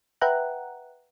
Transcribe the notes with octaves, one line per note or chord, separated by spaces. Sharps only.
B4 E5 F#5 G5 A#5 F#6